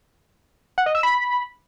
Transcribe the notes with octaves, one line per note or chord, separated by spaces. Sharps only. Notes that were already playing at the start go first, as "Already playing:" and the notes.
F#5
D#5
E6
B5